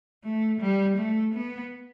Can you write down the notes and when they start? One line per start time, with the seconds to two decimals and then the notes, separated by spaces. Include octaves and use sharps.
0.24 A3
0.60 G3
0.97 A3
1.34 B3